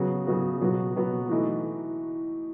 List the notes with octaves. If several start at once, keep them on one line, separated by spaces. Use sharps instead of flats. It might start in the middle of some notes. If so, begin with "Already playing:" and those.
Already playing: C#3 F#3 B3 F#4
C#3 F#3 B3 F#4
B2 F#3 B3 F#4
B2 F#3 B3 F#4
E3 A3 D#4 F#4